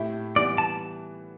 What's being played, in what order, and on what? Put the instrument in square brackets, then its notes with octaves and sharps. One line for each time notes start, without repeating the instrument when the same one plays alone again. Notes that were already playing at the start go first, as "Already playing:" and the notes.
Already playing: [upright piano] A2 A3 E4 G4
[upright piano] E3 G3 B3 [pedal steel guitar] D5
[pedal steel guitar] A5